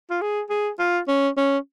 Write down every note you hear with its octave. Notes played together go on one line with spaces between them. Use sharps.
F4
G#4
G#4
F4
C#4
C#4